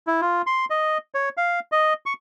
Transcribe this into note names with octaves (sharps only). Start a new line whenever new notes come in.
E4
F4
C6
D#5
C#5
F5
D#5
C#6